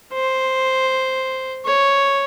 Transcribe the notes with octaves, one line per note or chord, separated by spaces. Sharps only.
C5
C#5